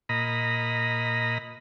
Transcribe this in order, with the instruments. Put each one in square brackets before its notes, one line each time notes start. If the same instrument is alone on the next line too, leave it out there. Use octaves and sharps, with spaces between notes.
[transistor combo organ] A#2 D#5 A#5 B5